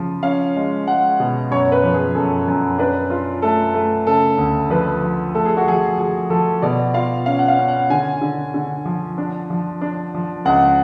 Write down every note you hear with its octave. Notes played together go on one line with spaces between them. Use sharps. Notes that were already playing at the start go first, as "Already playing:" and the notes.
Already playing: C#3 F3
C#4 F5
G#3
G#3 F#5
B2
F#2 C#5
B4
F3
G#4
F#2 A4
F#2
D4 B4
F4
A3 A4
A3
C#3 A4
D2
F3 B4
F3
A3 A4
G#4
F#4
F3 G#4
F3 G#4
F3 A4
B2 D5
F4 F5
C#4 F5
F#5
F5
C#4
F#5
D3 G#5
D3
D3
F3
D4
F3
D4
F3
C#2 F#5